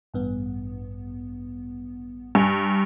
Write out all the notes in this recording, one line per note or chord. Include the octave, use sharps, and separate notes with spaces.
A1 G2 B3
G2 G#5